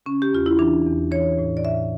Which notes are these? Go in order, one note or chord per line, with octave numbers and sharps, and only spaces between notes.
C#3 C#4
G4
E2 F4
E4
E3 D4
E2
E3 C#5
A2
D5
A2 E5